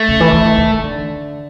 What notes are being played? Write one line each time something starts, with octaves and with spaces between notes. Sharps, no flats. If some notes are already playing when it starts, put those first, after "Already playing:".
Already playing: A3
C#3
E3
E3
D#3
D#3
D3